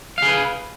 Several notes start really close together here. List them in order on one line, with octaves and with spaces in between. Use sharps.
F5 G#4 B4